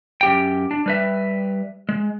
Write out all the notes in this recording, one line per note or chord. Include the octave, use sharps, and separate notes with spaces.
F#2 G4 G5
D4
G3 B4 E5
G#3